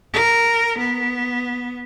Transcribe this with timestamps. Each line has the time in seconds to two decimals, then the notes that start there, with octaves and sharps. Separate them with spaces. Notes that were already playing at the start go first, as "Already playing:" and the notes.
0.14 A#4
0.79 B3